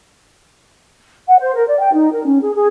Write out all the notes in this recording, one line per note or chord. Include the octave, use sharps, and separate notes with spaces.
F#5
C5
A#4
D5
G5
D#4
A#4
C#4
G#4
G#4